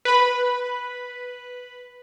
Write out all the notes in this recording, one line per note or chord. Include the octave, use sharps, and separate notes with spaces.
B4 B5